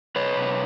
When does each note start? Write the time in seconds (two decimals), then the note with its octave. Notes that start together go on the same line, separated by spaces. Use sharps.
0.16 C3 B4 C#5
0.37 C3